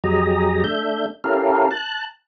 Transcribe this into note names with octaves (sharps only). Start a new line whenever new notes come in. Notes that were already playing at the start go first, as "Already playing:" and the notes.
F2 F#3 G4 G#4 D#5 A#5
A3 D4 E5 G6
C#4 E4 G4 A4 A#4 F5
A5 F#6